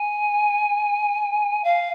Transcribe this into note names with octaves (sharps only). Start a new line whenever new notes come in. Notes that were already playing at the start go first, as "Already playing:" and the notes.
Already playing: G#5
F5